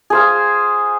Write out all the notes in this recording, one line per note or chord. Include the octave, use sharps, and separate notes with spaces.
G#4 C5 F5